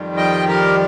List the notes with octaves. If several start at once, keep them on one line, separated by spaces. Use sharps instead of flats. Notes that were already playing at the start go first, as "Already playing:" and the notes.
Already playing: F2 D#3 G3
D#5 G5
G4 A#4